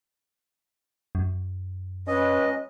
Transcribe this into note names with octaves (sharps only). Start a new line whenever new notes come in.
F#2
C#4 B4 D#5